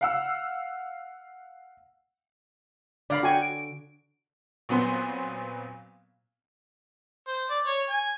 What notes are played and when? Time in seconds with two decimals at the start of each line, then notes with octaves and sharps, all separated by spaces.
0.01 F5 F#5 E6
3.10 D3 D5 F5 A#5 B5
3.23 F#4 G5 G#5
3.42 D7
4.69 A#2 F#3 B3 C4 C6
7.28 C5
7.50 D5
7.67 C#5
7.90 G#5